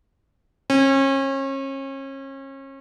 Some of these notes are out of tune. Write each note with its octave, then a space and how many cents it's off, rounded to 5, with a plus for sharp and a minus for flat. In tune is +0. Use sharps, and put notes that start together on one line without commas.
C#4 -35